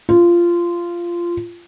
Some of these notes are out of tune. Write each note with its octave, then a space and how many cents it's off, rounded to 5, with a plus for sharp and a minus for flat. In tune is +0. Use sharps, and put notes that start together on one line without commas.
F4 -15